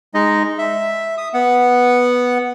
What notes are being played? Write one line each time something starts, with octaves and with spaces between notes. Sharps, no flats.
G#3 D#4 D#5
E5
D#6
B3 F#5